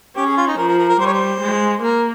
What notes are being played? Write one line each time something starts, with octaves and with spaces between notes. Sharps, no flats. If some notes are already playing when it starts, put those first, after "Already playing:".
C#4 G4
G#4
F4
D#4
F3 A#4
A#4
A#4
A#4
G3 C5
C#5
C5
G#3
A#3 A#4